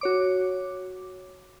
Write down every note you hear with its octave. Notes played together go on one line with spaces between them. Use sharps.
F#4 C#5 D6